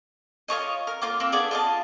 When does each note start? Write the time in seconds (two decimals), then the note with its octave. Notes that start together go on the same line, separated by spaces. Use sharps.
0.48 F4 A#4 C#5 D#5
0.87 A#4
1.02 A#3 F4
1.20 A#3 C4
1.32 B3 D4 G#4 D5
1.51 F4 D#5 A5